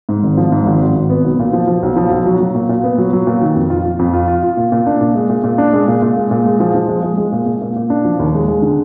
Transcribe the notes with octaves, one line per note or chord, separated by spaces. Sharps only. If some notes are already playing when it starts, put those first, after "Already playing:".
G#2
G#1
F3
G#2
G#1
G#1
G#1
B3
B1
A#2
F3
F3
B1
F3
B1
F#3
F#3
A#2
A#2
B3
F#3
F#3
A#2
D#3
F2
F4
F4
F2
F4
F4
F4
A#2
A#2
D4
A#2
G#3
A#2
A#2
D4
G#3
A#2
A#2
G#3
A#2
G#3
F3
F3
G#3
G#3
G#3
A#2
A#2
A#2
A#2
D4
F3
D#2
G#3
G#3
D3